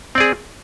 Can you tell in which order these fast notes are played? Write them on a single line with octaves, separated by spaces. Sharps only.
C4 D5 G#4